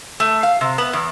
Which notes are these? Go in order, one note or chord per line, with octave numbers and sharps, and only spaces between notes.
A3
F5
C3
B3
E2